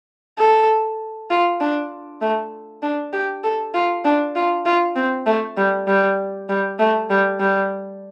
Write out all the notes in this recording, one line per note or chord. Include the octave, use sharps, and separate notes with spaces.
A4
F4
D4
A3
D4
G4
A4
F4
D4
F4
F4
C4
A3
G3
G3
G3
A3
G3
G3